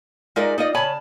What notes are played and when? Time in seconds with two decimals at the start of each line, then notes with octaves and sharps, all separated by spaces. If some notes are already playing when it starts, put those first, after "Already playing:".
0.36 G#3 D#4 F4 A#4 D5 E5
0.58 D#4 F4 D5 D#5
0.75 C#3 C#5 G#5 A5 B5